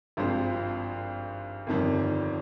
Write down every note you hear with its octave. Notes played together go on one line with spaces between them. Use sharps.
G#1 G2 F3 G#3 C4
G1 F2 D#3 G3 D4